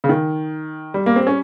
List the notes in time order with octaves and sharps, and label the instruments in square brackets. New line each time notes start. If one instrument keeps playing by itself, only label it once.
[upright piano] C#3
D#3
G3
A#3
C4
C#4